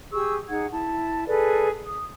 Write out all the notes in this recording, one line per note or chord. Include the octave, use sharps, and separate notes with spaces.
G4 G#4 C#6 E6
D#4 G#4 F#5 G#6
E4 A5
G#4 A4 B4 D5
D#6